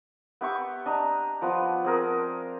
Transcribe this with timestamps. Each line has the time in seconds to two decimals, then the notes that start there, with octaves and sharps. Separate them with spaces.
0.41 B3 G4 E5 C#6
0.86 D4 D#5 A#5
1.42 F3 B3
1.84 C4 G#4 A#4